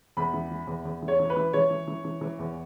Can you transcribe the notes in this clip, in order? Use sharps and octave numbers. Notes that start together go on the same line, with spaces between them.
E2 B5
E3
E3
E2
E2
E3
C#5
E3
B4
E3
E3 C#5
E3
E3
E3
E3
E2